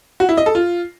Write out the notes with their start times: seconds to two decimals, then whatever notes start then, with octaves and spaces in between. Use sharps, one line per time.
0.20 F#4
0.29 E4
0.37 D#5
0.46 A4
0.55 F4